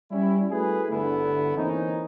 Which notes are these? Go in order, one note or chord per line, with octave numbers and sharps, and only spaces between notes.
G3 C#4 E4
A3 E4 F#4 G#4 B4
G1 G2 D3 A3 B3 E4
E3 A#3 C4 C#4 D#4